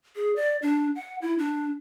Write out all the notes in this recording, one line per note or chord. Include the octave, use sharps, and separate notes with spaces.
G#4
D5
D4
F#5
E4
D4